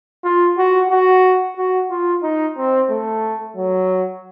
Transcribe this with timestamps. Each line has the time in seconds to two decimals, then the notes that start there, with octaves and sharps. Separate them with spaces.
0.24 F4
0.58 F#4
0.90 F#4
1.57 F#4
1.90 F4
2.23 D#4
2.57 C4
2.90 A3
3.56 F#3